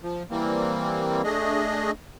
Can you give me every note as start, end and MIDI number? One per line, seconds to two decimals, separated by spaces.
0.03 0.23 53
0.31 1.22 52
0.31 1.22 55
0.31 1.22 58
0.31 1.22 60
1.24 1.91 57
1.24 1.91 62
1.24 1.91 68
1.24 1.91 75